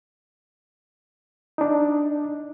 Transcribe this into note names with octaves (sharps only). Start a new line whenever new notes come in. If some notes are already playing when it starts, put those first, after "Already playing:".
D4 D#4